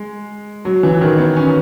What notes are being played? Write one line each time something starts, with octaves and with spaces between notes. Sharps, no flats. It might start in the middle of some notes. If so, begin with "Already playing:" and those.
Already playing: G#3
F#3
E3
D#3
B3
C#4